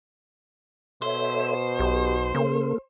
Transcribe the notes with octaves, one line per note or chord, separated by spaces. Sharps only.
B2 A4 C5 C#5 E5
B1 G4
C#3 A#3 A4 A#4